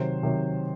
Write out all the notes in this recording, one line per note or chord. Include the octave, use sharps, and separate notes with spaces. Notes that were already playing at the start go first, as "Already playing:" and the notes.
Already playing: C3 D#3 F#3 C5
C3 D#3 F#3